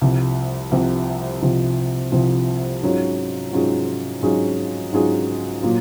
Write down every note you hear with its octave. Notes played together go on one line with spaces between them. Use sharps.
C2 C3 F3
C2 C3 F3
C2 C3 F3
C2 C3 F3
G#2 F#3 C#4 F4 G#4
G#2 F#3 C#4 F4 G#4
G#2 F#3 C#4 F4 G#4
G#2 F#3 C#4 F4 G#4
A#2 F#3 A#3 F4